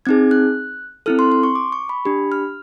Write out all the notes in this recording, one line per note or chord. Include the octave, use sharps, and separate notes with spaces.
C4 D#4 G#4 G#6
F#6
C4 E4 A4 F6
C6
C6
C#6
D6
C#6
B5
D4 G4 B5
F6